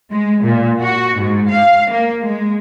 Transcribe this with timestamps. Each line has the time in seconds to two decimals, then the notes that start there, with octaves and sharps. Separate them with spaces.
0.12 G#3
0.44 A#2
0.80 F#4
1.20 G#2
1.50 F5
1.91 A#3
2.23 G#3